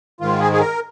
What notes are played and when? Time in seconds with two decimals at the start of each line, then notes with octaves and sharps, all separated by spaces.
0.21 G#2 D#3 F4
0.40 G#4
0.53 G#4
0.59 A#4